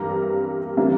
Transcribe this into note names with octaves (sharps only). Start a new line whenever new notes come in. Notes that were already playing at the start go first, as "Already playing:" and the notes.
Already playing: G2 E3 G3 A#3 D4 A#5
E3 G3 A#3 D4